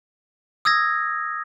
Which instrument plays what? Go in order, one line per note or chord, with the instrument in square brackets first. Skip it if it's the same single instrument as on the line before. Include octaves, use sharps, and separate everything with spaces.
[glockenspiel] D#6 E6 G#6 A#6